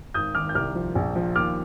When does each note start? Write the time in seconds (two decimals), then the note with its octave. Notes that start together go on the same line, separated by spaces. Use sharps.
0.14 G#1 D#6 G6
0.35 D#3 D6 F6
0.49 G6
0.55 C2 D6 F6
0.75 F3
0.95 A#1
1.15 F3
1.35 D#2 D6 F6